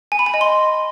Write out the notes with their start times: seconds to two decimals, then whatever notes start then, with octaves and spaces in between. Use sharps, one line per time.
0.12 G#5
0.19 B5
0.26 G#5
0.34 D#5
0.41 C6